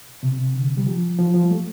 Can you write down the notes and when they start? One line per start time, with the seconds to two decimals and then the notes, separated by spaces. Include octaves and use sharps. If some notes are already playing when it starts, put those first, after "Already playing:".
0.23 C3
0.38 C3
0.54 D3
0.77 G3
0.87 F3
1.19 F3
1.34 F3
1.43 G3
1.50 A3